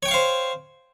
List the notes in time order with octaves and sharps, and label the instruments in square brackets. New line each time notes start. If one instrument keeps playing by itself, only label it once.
[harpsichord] C#5
G5
C#6
F5
C5